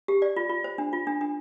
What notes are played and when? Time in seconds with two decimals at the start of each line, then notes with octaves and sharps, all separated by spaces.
0.08 G4
0.22 D5
0.37 F4
0.49 F4
0.64 C5
0.78 D4
0.93 F4
1.07 D4
1.21 D4